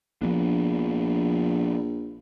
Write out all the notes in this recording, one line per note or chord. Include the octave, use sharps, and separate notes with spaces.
A#1 F3 B3 D4